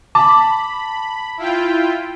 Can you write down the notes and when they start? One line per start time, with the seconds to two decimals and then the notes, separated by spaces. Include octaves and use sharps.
0.15 A5 B5 D6
1.37 E4 F4 G5